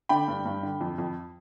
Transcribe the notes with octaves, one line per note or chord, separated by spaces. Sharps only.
D3 G5 B5
G2
G2
D3
F2
F2